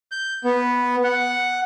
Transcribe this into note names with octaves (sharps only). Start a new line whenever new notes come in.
G6
B3
F#5